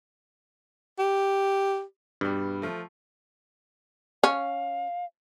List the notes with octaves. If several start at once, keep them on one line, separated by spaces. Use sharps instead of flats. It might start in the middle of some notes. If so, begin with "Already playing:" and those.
G4
G2 B2 G3
F3 A3
C#4 F5